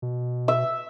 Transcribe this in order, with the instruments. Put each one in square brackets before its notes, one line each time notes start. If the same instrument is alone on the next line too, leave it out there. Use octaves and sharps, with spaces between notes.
[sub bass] B2
[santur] E5